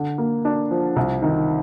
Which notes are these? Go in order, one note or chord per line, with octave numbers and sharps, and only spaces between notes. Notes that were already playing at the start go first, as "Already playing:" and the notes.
Already playing: D3
A#3
D4
F3
C2
D#3